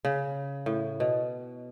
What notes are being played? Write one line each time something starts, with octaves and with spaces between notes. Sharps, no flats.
C#3
A2
B2